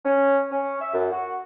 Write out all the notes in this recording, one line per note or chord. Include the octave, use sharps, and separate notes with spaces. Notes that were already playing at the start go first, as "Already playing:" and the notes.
C#4
C#4
E5
F#2
F#4